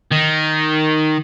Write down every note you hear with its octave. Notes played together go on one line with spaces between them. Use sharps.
D#3